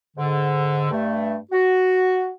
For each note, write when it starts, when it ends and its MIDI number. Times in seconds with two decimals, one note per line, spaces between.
0.17 0.90 44
0.17 0.90 50
0.91 1.36 43
0.91 1.36 57
1.52 2.31 66